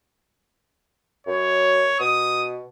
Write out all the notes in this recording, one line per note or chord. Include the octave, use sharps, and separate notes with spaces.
F#2 C#5
B2 D#6